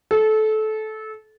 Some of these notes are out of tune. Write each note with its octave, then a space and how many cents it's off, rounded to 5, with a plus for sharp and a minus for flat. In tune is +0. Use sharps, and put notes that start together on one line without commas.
A4 -20